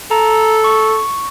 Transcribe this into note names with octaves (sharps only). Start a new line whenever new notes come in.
A4 A#5
C#6